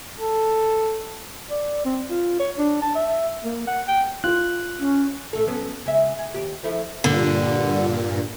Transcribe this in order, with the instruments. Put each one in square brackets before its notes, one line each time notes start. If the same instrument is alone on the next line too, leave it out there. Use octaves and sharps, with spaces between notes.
[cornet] A4
[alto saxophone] D5
C4
F4
C#5
D4
A5
E5
A#3
F#5
G5
[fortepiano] F4 [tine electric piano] F#6
[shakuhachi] C#4
[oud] A2 A3 A4
F#3 B3 C#4
C#3 G#3 E5
G#4
D#2 G4
F3 A3 E4
[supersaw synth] G2 A#2 [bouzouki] D3